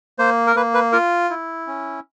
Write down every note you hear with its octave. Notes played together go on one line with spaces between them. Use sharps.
A#3 C5
A#4
A#3 B4
B4
F4 A#4
E4
C#4